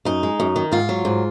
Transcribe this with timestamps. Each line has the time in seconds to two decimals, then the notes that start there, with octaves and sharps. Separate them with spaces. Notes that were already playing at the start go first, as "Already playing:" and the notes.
0.05 F#2 D#4
0.23 G#3
0.40 F#2
0.56 D#3
0.72 G#2 F4
0.89 F#3
1.05 G#2